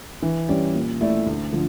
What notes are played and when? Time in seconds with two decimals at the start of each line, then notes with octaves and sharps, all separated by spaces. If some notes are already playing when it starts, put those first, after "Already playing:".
0.22 E3
0.49 G3 C#4 G4 D5
0.75 A#2
1.01 A3 E4 A4 D5
1.26 D2
1.53 D3 F3